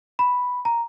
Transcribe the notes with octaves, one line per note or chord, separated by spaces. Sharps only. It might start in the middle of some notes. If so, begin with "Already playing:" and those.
B5
A#5